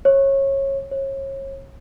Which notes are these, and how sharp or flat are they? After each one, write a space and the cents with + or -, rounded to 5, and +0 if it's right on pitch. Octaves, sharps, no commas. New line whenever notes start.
C#5 -25
C#5 -35